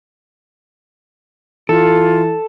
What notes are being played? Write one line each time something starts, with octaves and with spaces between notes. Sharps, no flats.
E3 F4 A4